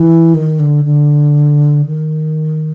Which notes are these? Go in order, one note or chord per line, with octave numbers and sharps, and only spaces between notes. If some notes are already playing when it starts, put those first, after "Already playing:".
Already playing: E3
D#3
D3
D3
D#3